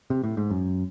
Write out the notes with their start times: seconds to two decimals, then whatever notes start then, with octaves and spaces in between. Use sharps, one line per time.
0.10 C3
0.23 A2
0.37 G#2
0.51 F#2